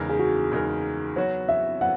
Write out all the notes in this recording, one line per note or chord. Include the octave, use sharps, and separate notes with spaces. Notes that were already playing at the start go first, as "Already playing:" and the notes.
Already playing: E2 C#3 G#3 D#4 A#4
G#4
F#4
E2 C#3 G#3 D#4 A#4
F#3 B3 F#4 C#5
E5
F#3 B3 F#5